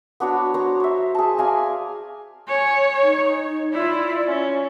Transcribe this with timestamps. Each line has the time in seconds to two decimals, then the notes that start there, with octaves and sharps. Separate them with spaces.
0.20 B3 D4 F#4 C#5
0.54 C5 C#5 A#5
0.80 C5 E5
1.15 G#4 A5
1.38 D5 F5 G#5 A#5
2.48 C#5 G#5
3.03 D#4
3.72 E4 F4 D5
4.26 C#4